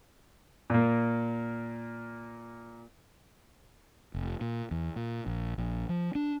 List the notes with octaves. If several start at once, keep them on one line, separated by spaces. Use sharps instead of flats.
A#2 A#3
F1
A#2
E2
A#2
A#1
A#1
F3
D4